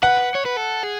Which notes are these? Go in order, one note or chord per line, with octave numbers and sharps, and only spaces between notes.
B4 F#5
C#5
B4
A4
G#4